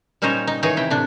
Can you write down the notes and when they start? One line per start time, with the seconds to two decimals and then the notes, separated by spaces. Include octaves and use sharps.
0.22 A#2 G3 C#4 D#4 C5 C#5
0.47 D#4
0.63 D#3 E3 D#4 G#4 C#5
0.77 C3 E4 G5
0.90 A2 C3 D4